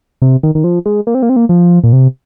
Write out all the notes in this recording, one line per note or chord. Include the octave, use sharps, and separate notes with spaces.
C3
D#3
D#3
F3
G#3
A#3
C4
A#3
C4
A#3
F3
A#2
C3